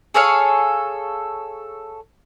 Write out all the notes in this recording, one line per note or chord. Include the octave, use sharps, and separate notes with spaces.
G#4 A4 C#5 F5